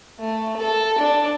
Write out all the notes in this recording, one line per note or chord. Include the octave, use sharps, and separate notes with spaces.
A3
A4
D4